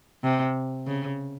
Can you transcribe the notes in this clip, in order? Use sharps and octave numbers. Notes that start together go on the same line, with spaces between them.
C3
C#3